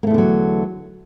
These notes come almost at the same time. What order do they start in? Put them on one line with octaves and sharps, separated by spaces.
A#3 A3 E2 D3 F#3